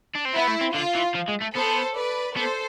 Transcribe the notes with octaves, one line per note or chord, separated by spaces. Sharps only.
D4
C4
B3 E4
A3
C4
D3 F4
E3
F3
G#3
A3
B3 A4 C5
B4 D5
B3 A4 C5